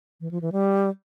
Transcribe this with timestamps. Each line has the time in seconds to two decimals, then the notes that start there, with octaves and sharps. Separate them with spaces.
0.21 E3
0.31 F3
0.42 E3
0.52 G3